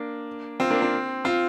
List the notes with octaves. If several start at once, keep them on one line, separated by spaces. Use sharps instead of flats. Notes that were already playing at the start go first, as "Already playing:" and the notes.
Already playing: A#3 D4
C4 F4
A#3 D4
C4
C4 F4